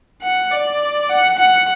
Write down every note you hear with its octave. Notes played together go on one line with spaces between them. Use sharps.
F#5
D5
F#5
F#5